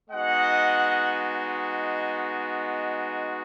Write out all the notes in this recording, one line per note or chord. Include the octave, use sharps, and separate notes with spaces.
G#3 B3 D#4 F#4 D#5 F#5